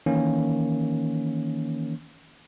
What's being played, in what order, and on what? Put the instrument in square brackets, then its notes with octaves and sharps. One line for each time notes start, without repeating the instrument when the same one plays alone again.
[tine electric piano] D#3 E3 A#3 C#4